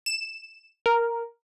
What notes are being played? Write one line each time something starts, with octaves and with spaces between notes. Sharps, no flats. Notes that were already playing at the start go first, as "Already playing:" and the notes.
E7
A#4